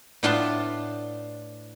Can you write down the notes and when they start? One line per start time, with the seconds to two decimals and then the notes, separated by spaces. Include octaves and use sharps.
0.23 A2 B3 D4 F4 A5 C6